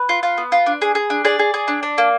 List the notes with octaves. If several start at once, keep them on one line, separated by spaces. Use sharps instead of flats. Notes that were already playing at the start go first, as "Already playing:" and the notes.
Already playing: B4
F4
F4
B3
F4
D4
G#4
G#4
D4
G#4 D5
G#4
G#4
D4
D4
A#3